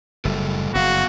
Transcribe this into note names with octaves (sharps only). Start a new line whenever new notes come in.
F#1 A2 G3 A4
F#1 F2 B3 F#4 F5